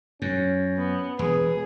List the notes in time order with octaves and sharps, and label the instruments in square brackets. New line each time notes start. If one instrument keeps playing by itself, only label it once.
[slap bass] F#2 [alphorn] C#4
[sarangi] B3
[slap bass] E1 [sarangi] G#4 [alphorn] B4